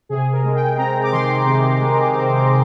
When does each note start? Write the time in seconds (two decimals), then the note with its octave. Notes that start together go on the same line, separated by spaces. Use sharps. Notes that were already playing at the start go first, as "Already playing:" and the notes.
0.09 C3 G#4
0.32 A#4
0.44 G#3
0.55 G5
0.78 C4 A#5
1.03 D6
1.12 D#3 C6
1.46 C3
1.81 G#3
2.15 C4